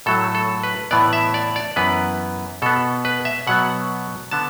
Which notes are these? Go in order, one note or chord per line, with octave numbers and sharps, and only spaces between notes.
A2 F#3 A3 A4
A4
B4
A2 E3 B3 D5
E5
D5
D5
F#2 E3 B3 B4
B2 B3 A4
B4
E5
B2 F#3 B3 F#5
D3 B3 A5